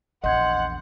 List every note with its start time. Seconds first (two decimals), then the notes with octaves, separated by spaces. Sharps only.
0.24 A#1 E2 D#5 F#5 C6 G6 G#6